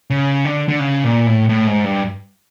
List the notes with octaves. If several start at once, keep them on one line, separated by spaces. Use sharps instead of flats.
C#3
D3
D3
C#3
A#2
A2
A2
G#2
G2